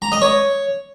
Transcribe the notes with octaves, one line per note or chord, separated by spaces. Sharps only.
A#5
D#5
C#5